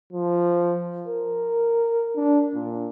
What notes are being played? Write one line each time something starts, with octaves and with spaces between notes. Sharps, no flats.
F3
A#4
D4
A#2